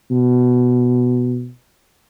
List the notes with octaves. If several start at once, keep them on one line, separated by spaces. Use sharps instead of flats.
B2